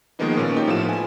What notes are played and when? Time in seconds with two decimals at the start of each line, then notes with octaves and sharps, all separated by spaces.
0.19 D#3 F3 G#3 A#3 B3 D#4
0.37 A#2 C#4
0.56 A#3 D#4 G4
0.67 A2 F3 B3 F4 A4 E7
0.85 B4 G#5